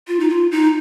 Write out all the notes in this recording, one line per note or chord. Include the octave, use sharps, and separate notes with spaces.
F4
D#4
F4
D#4